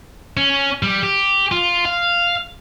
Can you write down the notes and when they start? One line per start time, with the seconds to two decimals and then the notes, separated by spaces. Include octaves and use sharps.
0.37 C#4
0.83 G3
1.03 G4
1.52 F4
1.85 F5